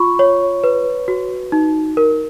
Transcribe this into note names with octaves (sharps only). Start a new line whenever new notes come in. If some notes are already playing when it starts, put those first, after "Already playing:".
Already playing: F4 B5 C#6
C#5
B4
F#4
D#4
A#4